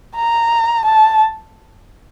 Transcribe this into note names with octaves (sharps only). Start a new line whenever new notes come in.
A#5
A5